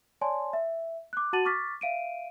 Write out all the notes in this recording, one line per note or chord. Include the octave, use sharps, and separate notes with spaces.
C#5 D5 G#5 A5 C6
E5
D6 F#6
F#4 F#5 A5 A6 D#7 F#7
C#6 D6 F6 A6 B6
E5 F5 D7 D#7